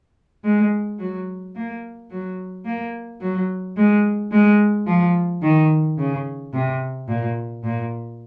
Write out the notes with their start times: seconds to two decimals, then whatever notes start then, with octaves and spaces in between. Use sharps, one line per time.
0.44 G#3
0.99 F#3
1.55 A#3
2.10 F#3
2.65 A#3
3.21 F#3
3.77 G#3
4.32 G#3
4.86 F3
5.42 D#3
5.98 C#3
6.53 C3
7.08 A#2
7.63 A#2